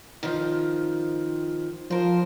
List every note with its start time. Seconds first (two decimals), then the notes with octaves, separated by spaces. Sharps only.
0.23 D#3 F3
1.90 F3 A#4 C5